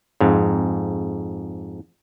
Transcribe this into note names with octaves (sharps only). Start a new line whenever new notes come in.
F2 G#2